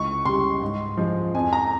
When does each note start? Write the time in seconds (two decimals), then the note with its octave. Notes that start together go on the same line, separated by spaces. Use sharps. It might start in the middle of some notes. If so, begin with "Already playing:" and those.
Already playing: C#2 C#6
0.25 C#3 G3 C6
0.62 G#2
0.97 F3 G#3
1.34 F2 G#5
1.53 A#5